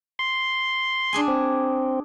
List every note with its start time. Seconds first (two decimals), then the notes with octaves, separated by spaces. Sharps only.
0.19 C6
1.13 D4 G#4 G#5
1.28 C4